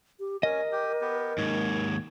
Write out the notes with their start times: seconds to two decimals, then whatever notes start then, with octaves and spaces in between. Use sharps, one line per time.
0.20 G4
0.43 C#4 A#4 D#5
0.72 G4
1.01 B3 G4
1.38 D#2 G#2 C#5